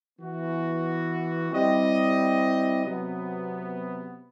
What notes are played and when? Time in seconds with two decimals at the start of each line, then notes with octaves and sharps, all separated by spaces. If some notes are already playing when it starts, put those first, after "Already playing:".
0.18 E3 B3 F#4
1.52 G3 C4 E4 G4 D#5
2.84 C3 F#3 B3